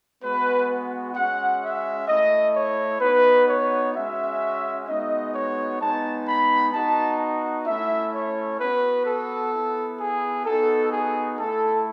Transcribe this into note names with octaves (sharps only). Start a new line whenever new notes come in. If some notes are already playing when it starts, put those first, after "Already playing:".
G#3 B3 F#4 B4
G#3 C#4 F#4 F#5
E5
A3 E4 D#5
C#5
B3 D#4 F#4 B4
C#5
G#3 C#4 F#4 E5
G#3 B3 D#4 F#4 D#5
C#5
G#3 B3 D#4 A5
B5
B3 D#4 F#4 A5
A3 C#4 E4 E5
C#5
B3 F#4 B4
A4
B3 E4
G#4
B3 D#4 F#4 A4
G#4
A3 E4 A4